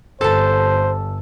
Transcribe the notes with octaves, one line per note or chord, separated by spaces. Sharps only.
G1 A4 C5 A5